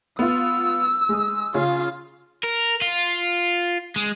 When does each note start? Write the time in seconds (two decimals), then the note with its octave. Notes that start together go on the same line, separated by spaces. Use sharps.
0.19 B3 F4 E6
1.09 G#3 D#6
1.54 C#3 C#4 F4 F5
2.43 A#4
2.82 F4
3.96 G#3